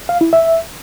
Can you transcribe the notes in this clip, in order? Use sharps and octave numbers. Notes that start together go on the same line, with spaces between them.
F5
E4
E5